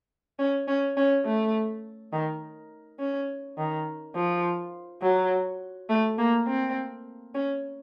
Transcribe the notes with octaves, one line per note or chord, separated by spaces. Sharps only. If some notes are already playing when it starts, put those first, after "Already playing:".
C#4
C#4
C#4
A3
D#3
C#4
D#3
F3
F#3
A3
A#3
C4
C#4